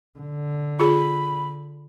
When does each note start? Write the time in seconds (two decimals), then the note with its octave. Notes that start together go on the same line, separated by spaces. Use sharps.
0.19 D3
0.80 F4 G#4 B5